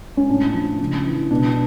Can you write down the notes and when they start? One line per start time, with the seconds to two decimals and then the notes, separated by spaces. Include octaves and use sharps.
0.17 C#4
0.29 A2 D4
0.54 F3
0.80 C#3
1.06 E3
1.31 B2 D4